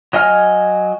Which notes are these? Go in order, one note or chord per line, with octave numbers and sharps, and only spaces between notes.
F#3 D#5 G#5 F6